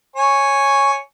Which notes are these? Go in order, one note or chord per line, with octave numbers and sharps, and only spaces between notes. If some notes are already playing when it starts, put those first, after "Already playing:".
C#5 G#5